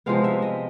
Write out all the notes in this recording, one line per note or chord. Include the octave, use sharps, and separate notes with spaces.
C3 F3 G#3 B3 F5
E5
D#5